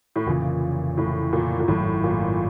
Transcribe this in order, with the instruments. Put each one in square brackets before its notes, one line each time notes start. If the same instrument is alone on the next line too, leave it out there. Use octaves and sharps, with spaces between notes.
[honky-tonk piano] A2
[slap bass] F1 D#2 C#3 E3 [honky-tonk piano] A#2
[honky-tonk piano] A2
A#2
A#2
[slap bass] G#1 F#2 C#3 F#3 [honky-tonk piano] A2
[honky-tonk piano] A#2